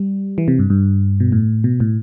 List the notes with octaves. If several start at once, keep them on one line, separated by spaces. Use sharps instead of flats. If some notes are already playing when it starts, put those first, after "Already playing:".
Already playing: G3
E3
C3
G2
G2
B2
A2
B2
A2